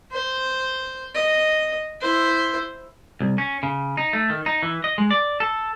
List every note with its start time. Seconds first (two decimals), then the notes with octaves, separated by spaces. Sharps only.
0.11 C5
1.15 D#5
2.01 E4 C5
3.20 C2
3.38 C#4
3.63 C#3
3.97 D#4
4.13 A3
4.30 D#3
4.46 D#4
4.63 E3
4.84 D#5
4.98 G#3
5.11 D5
5.40 A4